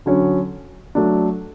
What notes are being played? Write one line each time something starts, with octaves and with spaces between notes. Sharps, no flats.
D3 F#3 C#4
F#3 A3 D4